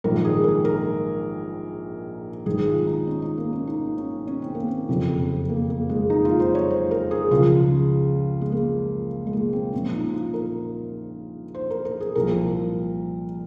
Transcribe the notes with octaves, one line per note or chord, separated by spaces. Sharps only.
A#1 G#2 D#3 A#4
G#4
A#4
A#4
G#1 G#2 D#3 G#4
F4
D#4
C#4
D#4
A#3
C#4
D#4
C#4
C#4
C4
A#3
C4
F#1 F2 C3
A#3
A#3
G#3
D#4
F4
C5
C#5
C5
A#4
G#4
C#2 C#3 F3 F4
G#3
A#3
G#3
A#3
C4
A#1 A#2 F3 C#4
D#4
F4
A#4
C5
A#4
A#4
G#4
C2 A#2 F3 A#4